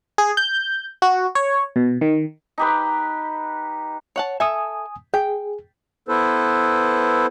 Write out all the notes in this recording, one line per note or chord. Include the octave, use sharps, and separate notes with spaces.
G#4
G6
F#4
C#5
B2
D#3
D#4 G4 B4
C#5 F#5 A5
A4 E5 G#5 D#6
G#4 G5
B3 E4 A4 B4 C5